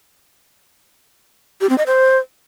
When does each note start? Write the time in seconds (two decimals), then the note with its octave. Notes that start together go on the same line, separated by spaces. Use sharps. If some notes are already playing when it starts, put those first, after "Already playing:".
1.61 G4
1.69 C4
1.78 D#5
1.87 C5